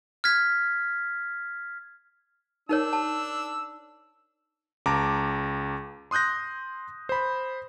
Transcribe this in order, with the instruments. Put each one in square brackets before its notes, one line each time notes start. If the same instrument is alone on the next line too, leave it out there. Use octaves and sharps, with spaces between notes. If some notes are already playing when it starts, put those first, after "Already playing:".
[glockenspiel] F6 G#6 B6
[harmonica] D4 E6 [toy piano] D#4 A#4 C#5
[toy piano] A5
[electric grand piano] C#2 A5 A#5 D6
C6 D#6 F#6 G6 A#6
C5 B5